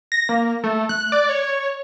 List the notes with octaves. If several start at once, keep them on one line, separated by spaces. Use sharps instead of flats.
A#6
A#3
A3
F#6
D5
C#5